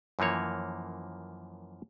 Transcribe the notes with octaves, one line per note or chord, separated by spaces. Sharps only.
F#2 E3 F3 A#3 C#5